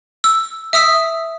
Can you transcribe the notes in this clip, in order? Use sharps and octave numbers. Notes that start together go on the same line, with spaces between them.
E6
E5 D#6 E6 B6